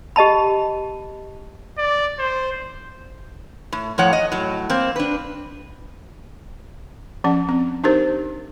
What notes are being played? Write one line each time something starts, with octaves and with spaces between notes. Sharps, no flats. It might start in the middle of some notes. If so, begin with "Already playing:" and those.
G4 D#5 A5 B5
D5
C5
A2
A2 F3 C#5 F#5
D#5
A2 F#3
A#3 C4
D4 B4
F3 C#4 F#5
C4
D4 D#4 G4 A#4 C5